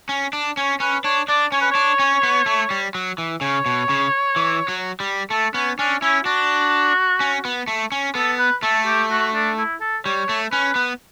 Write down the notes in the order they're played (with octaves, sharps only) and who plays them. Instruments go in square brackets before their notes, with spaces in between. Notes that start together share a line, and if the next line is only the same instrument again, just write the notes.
[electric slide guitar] C#4
D4
[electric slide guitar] C#4 [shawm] C#5
[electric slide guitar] C#4 [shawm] B4
[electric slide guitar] D4 [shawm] C#5
[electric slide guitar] D4 [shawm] D5
[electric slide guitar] C#4 [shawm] C#5
[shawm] B4
[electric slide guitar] D4 [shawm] C#5
[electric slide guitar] C#4
B3
A3
G3
F#3
E3
[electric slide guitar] C#3 [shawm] C#5
[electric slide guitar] B2
C#3
E3
F#3
G3
[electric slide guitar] A3 [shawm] A4
[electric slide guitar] B3 [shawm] C#4
[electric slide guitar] C#4 [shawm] D4
[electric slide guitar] C#4 [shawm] E4
[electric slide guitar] D4 [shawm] F#4
[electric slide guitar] C#4
B3
A3
C#4
[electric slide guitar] B3 [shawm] A4
[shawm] B4
[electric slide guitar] A3 [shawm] A4
[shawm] G4
F#4
D4
E4
A4
[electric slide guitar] G3 [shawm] C#5
[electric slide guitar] A3
[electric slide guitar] C#4 [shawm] B4
[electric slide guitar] B3